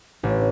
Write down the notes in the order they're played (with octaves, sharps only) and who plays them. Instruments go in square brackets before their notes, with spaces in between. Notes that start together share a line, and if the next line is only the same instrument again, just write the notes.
[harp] A1